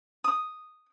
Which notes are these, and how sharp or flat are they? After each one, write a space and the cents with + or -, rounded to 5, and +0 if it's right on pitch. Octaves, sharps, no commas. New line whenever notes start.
D#6 -5